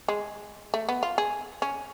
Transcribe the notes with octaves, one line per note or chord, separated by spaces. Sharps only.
G#3
A3
B3
F4
G#4
C#4